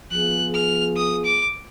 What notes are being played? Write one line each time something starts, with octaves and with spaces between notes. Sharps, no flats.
F3 B3 F4 G#4 F#6
F6
D#6
D6